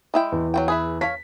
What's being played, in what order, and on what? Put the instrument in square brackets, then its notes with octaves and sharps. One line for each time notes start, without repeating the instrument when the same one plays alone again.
[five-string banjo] G#3 E4 G5
[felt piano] E2
[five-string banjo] F#3 F#4 G5
G#4 B4 E5
[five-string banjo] C#5 F5 [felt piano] B6